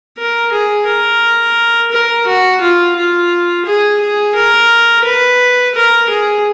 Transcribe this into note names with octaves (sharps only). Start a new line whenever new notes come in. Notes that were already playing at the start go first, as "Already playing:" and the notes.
A#4
G#4
A#4
A#4
F#4
F4
F4
G#4
G#4
A#4
B4
A#4
G#4